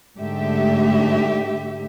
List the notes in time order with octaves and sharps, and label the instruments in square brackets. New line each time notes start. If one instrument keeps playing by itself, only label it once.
[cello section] G#2 D3 A3 G4 E5